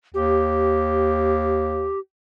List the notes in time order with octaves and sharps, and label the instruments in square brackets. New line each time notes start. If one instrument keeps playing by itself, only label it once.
[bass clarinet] D#2 [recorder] G4